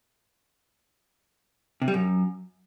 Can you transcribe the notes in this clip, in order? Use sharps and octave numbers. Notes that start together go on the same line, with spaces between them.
C3
G3
F#2